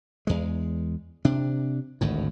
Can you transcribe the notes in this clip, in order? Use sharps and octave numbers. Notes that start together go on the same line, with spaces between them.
E2 G#3
C3 D4
G#1 D2 A2